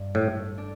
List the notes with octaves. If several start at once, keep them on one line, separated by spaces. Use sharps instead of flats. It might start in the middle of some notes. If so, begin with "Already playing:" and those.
Already playing: G2
A2 A3
D4